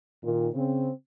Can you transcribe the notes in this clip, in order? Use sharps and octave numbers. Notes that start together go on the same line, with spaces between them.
A#2 D#3
C#3 C4